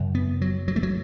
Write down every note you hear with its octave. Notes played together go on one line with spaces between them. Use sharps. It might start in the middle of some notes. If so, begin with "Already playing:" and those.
Already playing: F#2 C#3
B3
F#3
F#3
A3
F#3